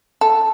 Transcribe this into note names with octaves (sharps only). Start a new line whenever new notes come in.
A4